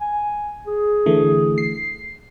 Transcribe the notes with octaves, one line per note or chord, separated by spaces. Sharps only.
G#5
G#4
D3 E3 A3
C7